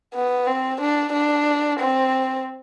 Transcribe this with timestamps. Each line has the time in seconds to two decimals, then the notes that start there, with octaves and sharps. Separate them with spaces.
0.15 B3
0.47 C4
0.81 D4
1.13 D4
1.80 C4